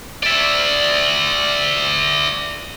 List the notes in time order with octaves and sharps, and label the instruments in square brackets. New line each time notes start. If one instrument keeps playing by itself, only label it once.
[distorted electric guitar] D5 E5